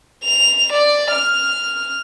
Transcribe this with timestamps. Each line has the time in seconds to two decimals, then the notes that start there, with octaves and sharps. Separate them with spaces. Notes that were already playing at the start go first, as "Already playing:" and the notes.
0.24 F7
0.73 D5
1.11 F6